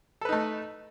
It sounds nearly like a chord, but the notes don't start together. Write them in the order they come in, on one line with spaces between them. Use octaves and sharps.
A4 B4 D#4 A3